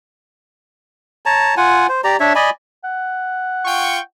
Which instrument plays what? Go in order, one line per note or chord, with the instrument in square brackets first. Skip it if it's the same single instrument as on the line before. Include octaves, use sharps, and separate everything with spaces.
[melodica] C#5 A5 A#5
F4 F#5 G#5
C5
G4 D5 A#5
D4 C#5 E5
D5 D#5 G#5 B5
[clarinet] F#5
[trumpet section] F4 G5 C#6